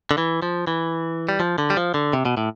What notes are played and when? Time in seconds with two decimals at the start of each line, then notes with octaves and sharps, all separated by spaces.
0.11 D3
0.18 E3
0.42 F3
0.67 E3
1.29 G3
1.40 F3
1.58 D3
1.70 G3
1.77 F3
1.94 D3
2.13 C3
2.25 B2
2.37 A2